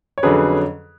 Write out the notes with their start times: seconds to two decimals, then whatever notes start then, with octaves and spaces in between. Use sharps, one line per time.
0.18 C#5
0.23 F2 D3 F#3 C#4 G#4 B4